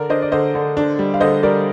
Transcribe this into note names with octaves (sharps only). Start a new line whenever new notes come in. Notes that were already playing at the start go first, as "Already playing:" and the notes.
Already playing: D3 A#4 D5
D4 C5 D#5
D5
D3 C5 D#5
D3
D4
G3
F5
D3 C5 D#5
G3 A#4 D5